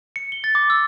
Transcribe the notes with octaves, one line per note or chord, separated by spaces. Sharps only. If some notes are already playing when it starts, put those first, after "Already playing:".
C#7
G7
A6
D6
E6